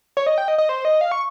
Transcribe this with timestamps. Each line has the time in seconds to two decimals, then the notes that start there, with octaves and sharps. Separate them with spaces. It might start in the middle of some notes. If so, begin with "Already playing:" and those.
0.17 C#5
0.26 D#5
0.38 G5
0.48 D#5
0.58 D#5
0.69 C5
0.85 D#5
1.01 F5
1.12 C#6